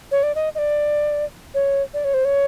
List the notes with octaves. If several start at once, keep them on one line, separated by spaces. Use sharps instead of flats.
C#5
D5
D#5
D#5
D5
C#5
D5
C#5
C5
C#5